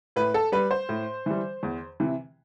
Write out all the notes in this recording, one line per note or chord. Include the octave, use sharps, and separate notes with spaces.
A2 B4
A4
G3 B4
C5
A2
E3 G3
E2
C3 E3